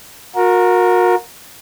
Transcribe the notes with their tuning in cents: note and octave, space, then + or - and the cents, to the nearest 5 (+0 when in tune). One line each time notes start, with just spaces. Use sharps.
F#4 -35 A#4 +0